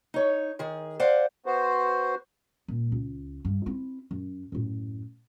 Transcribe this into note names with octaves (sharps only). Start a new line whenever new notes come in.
D#4 C#5
D#3 G#4
C5 D5 F5 F#5
B3 F#4 C5
A#2
C#2
G2
C4 E4
F#2
F#2 A2